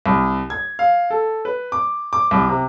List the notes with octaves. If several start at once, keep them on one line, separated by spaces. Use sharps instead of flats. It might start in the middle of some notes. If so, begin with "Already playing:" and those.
C2
G#6
F5
A4
B4
D6
D6
C2
C3